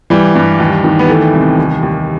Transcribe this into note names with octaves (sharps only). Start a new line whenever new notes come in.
E3 G3
G2
D#2
D#3
B3
E3 A3
C2
D#2
D#2